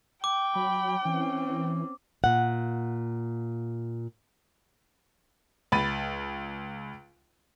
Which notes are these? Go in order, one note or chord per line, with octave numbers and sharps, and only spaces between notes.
G5 D6
F#3 B5
E3 C4 C#4
A#2 F#5
C#2 B5 A6 D#7